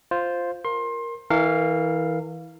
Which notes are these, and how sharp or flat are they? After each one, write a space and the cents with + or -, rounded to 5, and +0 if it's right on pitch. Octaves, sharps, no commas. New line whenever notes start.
F4 +0 C5 +0
A#4 +0 C6 +25
E3 -25 A#4 -40 F5 +0